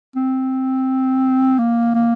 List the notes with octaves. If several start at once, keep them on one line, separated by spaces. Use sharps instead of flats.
C4
A#3
A#3